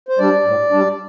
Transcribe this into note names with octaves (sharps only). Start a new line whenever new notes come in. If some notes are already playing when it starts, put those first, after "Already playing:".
C5
G3 D4 D5
A2
G3 D4